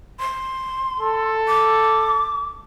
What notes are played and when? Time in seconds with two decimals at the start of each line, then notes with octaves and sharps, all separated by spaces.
0.19 C6
1.00 A4
1.48 D6